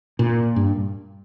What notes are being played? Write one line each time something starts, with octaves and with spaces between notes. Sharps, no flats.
A#2
G2